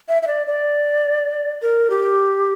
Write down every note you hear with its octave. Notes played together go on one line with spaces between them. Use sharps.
E5
E5
D5
D5
A#4
G4